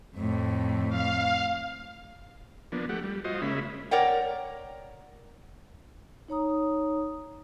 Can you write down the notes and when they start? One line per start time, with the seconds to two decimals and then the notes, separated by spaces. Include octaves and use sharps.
0.17 F2 A2
0.89 F5
2.72 F3 A#3 B3 D4
2.89 A3 G4 F#5
3.04 G3
3.24 F4 F#4 C5 D#5
3.42 C#3 G#3 A#3 C#4 E5 B5
3.91 A#4 C#5 D5 F#5 G5
6.28 D#4 C#5 A#5 D#6